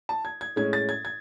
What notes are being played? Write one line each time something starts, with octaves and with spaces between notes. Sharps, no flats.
A5
G#6
G#6
A2 G#3 C#4 G#6
A6
G#6
G#6